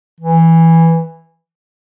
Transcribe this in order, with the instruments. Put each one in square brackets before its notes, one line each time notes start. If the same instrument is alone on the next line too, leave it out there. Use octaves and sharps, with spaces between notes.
[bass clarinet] E3